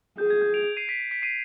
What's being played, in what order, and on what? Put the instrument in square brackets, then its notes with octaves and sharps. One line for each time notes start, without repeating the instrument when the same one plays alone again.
[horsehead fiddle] G#4 [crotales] G6
[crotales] G#6
G6
D7 F7
C7 D#7
B6 D7
C7
B6 D7
C7 D#7